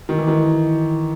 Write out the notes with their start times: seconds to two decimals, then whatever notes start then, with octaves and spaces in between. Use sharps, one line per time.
0.09 D#3
0.18 E3
0.28 D#3